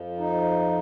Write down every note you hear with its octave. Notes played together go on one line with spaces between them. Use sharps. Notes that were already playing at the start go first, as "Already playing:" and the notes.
Already playing: F2 F3
D#4